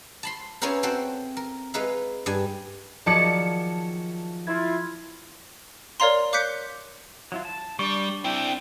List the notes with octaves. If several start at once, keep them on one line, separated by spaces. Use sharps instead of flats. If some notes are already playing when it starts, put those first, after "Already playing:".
A5 B5 C6
B3 C#4 E4 G#4 A#4 C5
C4 F#4 A4 C5 G5
A#4
G#3 D#4 B4 E5 F5
G2 D5 G#5
D#3 F3 F#3 G#4 D5 A5 C#7
E4 F4 G#6
A#4 C#5 D5 F5 A#5 C6
F5 D6 F#6 G6 B6 C#7
F#3 E4 F4
A5
G3 D4 D5 C#6
C4 E4 G5